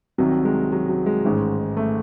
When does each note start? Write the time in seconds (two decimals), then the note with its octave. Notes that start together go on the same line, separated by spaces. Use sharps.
0.18 C2 C3 D#3 F#3
0.45 G#3
0.72 F#3
0.89 F#3
1.06 G#3
1.24 A1 G#2 D#3
1.77 A3